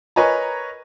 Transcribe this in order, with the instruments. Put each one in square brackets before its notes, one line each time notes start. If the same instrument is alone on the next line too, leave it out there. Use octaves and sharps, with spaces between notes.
[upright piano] A#4 B4 C#5 D#5 G#5 A#5